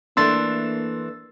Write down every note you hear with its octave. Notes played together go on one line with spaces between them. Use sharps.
E3 A3 A#3 D4 C6 E6 A6